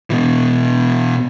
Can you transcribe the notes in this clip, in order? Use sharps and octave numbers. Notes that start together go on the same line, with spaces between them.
B2 E3